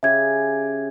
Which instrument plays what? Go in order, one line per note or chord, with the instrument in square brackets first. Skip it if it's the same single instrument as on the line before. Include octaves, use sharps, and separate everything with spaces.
[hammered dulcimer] C#3 G4 G#5 [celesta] E5 G#6